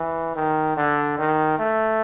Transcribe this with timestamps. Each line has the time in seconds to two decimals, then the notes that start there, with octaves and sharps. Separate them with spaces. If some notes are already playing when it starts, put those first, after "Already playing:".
Already playing: E3
0.36 D#3
0.77 D3
1.18 D#3
1.59 A3